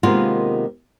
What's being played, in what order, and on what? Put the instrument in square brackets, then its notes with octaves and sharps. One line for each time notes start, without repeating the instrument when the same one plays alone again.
[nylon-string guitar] C3 D#3 G#3 A#3 B3 F4